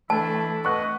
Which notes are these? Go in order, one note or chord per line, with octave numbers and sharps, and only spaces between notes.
E3 A3 D4 E4 A5
B4 D#5 F#5 C#6 F#6